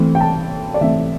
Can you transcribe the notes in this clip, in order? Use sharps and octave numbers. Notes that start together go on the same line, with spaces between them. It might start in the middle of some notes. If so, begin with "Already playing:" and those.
Already playing: E3 A3 C4
G5
A5
D5
E3 A3 C4 E5